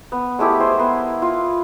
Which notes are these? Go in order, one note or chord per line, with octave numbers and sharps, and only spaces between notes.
B3
G#3 A3 E4 G4
C5 G#5
B3 A#4
F4